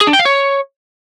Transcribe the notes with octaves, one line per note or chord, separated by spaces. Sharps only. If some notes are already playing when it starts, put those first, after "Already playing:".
G#4
D4
G5
F5
C#5